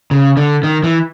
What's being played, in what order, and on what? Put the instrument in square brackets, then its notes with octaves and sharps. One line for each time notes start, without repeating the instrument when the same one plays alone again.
[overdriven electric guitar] C#3
D3
D#3
E3